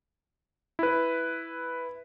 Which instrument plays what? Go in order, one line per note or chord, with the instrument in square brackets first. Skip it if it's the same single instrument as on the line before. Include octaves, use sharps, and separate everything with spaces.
[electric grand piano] E4 B4